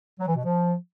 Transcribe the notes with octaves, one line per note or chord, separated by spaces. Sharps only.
F#3
E3
B2
F3